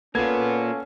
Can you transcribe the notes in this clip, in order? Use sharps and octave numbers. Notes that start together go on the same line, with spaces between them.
A#3 B3 C#4 F4 A4 G#6